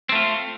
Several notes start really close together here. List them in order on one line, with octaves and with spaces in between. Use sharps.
C4 A3 F4